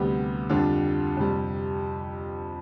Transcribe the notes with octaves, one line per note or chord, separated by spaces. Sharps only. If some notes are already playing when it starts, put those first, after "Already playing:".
Already playing: D2 C3 G3 B3
F2 D3 G3 D4 F4
F2 C3 G3